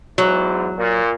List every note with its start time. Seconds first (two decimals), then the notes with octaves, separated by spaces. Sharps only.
0.18 E2 G#2 F#3
0.77 A#2